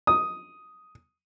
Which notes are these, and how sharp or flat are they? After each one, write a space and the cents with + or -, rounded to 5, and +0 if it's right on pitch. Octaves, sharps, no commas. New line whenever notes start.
D#6 +5